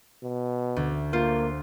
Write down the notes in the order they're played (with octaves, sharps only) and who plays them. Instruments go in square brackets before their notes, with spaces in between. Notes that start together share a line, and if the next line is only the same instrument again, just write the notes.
[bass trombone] B2
[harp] D2
[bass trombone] A#3 [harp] F4 C5